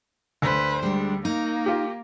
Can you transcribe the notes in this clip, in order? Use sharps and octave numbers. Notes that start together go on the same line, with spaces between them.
D2 B4 C5
G3 G#3 D4
A#3 D#4
F4 G4